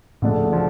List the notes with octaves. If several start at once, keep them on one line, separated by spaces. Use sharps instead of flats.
D2 A2 C#3 F3 A3 D4
F3 A3 D4